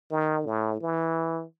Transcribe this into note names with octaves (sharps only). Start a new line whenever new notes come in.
D#3
A2
E3